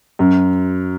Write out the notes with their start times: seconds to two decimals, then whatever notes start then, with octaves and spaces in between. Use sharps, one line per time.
0.19 F#2